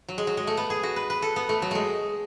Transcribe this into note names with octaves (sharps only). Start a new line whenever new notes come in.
F#3
G#3
F#3
G#3
A3
B3
G#4
F#4
B4
B4
A4
B3
A3
F#3
G#3 A3